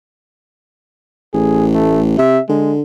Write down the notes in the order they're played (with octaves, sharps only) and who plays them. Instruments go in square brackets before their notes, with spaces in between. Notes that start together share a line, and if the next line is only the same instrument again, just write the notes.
[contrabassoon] A1 [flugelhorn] G#4
[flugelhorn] A3
[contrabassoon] C3 [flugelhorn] E5
[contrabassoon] D3 [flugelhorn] G#3